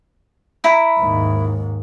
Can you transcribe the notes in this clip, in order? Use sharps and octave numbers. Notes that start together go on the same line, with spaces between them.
E4 A#5 B5
D#2 G#2